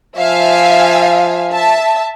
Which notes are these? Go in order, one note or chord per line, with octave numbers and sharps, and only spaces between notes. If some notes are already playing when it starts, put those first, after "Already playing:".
F3 E5 F5 G#5
E5 A5